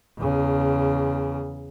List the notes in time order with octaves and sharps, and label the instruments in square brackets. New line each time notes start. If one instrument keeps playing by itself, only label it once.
[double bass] E2 C#3